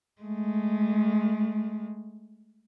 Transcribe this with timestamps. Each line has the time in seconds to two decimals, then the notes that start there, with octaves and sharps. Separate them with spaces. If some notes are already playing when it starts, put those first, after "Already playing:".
0.21 G#3 A3